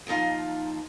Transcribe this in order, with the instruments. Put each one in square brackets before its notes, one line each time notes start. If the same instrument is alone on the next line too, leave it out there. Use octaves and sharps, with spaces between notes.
[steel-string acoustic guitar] D#2 F3 D#4 F4 F5